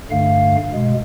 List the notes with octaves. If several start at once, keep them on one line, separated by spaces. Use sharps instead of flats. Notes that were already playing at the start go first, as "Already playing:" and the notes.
G2 D3 A3 F5
B2 G#3